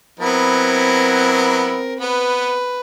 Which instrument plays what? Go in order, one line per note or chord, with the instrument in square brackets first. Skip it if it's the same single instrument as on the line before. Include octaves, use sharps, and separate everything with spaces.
[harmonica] F#3 B3 E4 [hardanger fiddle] C4 A#4
[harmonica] B3 [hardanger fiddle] B4